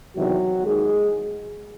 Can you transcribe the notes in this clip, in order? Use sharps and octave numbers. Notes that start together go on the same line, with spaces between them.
E2 C3 D#3 F#3 F#4
D#2 D#3 G#3 G#4